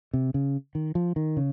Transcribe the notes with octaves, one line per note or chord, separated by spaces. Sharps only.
C3
C#3
D#3
F3
D#3
C#3